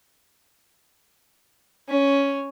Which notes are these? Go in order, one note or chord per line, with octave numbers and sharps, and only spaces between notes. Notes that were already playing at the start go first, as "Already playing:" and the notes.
C#4